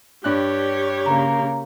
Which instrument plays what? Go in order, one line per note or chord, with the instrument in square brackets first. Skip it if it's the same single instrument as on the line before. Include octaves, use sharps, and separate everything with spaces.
[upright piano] G2 D4 F#6 [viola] G4 C#5
[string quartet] C#3 A#3 [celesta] A#5